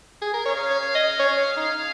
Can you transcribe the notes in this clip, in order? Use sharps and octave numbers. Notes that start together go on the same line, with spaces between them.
G#4
A#4
C#4 G#4 C#5 F5
C#5
D#5
C#5
D#4